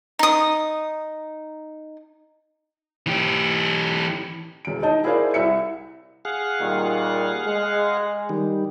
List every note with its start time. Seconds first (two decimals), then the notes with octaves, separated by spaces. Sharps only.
0.19 D#4 D#6
3.06 E3 G4
4.65 E1 D7
4.83 D#4 D#5 A5
5.04 E4 G#4 A#4 C5 D5 F5
5.34 C2 E5 C#7
6.25 G#4 F5 F#5
6.61 A#2 D#3 G3
7.47 G#3
8.29 D#3 G3